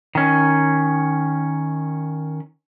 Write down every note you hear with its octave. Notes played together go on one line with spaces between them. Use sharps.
D#3 C#4